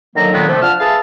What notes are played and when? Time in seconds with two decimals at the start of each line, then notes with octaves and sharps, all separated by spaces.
0.16 D3 D#3 F#3 A#3 A#5
0.32 A#2 D3 D#3 F#3 G#3 B3
0.48 C3 F3 A3
0.62 D4 F4 F#5 A5 F6
0.80 G#4 B4 E5 F5 A5